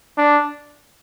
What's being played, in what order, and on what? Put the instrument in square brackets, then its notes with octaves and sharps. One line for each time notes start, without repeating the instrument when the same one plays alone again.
[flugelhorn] D4